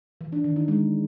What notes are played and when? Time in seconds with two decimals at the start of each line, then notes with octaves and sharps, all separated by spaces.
0.21 E3
0.32 D4
0.44 D#3
0.56 D#4
0.68 G#3